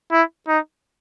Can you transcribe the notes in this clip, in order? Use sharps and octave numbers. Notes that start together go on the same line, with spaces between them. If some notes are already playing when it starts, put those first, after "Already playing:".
E4
D#4